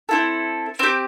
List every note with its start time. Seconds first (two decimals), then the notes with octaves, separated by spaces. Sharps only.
0.09 C4 E4 A4
0.79 C4 G4